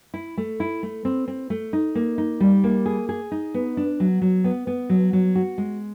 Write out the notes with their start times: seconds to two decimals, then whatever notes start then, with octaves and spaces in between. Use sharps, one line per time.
0.14 E4
0.37 A3
0.60 E4
0.83 A3
1.05 C4
1.28 C4
1.50 A3
1.73 D#4
1.95 A#3
2.18 D#4
2.40 G3
2.64 A#3
2.86 G#4
3.09 G#4
3.32 D#4
3.54 B3
3.77 D4
4.00 F#3
4.22 F#3
4.44 B3
4.67 B3
4.90 F#3
5.13 F#3
5.35 F#4
5.58 G#3